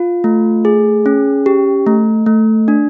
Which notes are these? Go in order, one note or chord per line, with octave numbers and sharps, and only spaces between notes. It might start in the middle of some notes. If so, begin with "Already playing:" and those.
Already playing: F4
A3
G#4
C#4
G4
A3
A3
D4